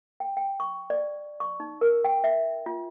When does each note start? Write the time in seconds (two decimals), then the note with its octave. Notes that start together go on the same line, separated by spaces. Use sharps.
0.20 G5
0.37 G5
0.60 C#6
0.90 D5
1.40 C#6
1.60 D#4
1.81 A#4
2.04 G5
2.24 E5
2.66 F4